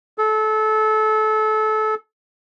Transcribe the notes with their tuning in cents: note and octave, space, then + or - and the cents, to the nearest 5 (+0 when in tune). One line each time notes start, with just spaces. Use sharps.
A4 -25